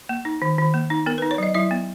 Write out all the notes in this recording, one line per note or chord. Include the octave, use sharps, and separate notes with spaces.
A#3
D#4
D#3
D#3
A#3
D#4
B3 A#4
D#4 B4
C#5
F#3 D#5
F#3 E4 E5
B3